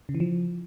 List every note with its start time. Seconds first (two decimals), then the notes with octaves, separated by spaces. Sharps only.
0.09 C#3
0.15 E3
0.20 F3